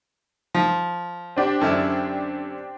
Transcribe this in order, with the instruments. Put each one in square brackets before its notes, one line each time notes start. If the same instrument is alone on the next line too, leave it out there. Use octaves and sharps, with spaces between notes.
[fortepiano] F3
[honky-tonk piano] C4 D4 G4
[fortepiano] F#2 D3 E4